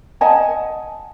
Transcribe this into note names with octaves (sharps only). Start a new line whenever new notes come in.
D#5 F#5 G#5 A5